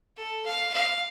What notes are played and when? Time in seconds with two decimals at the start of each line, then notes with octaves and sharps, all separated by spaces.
0.17 A4
0.46 F5
0.74 F5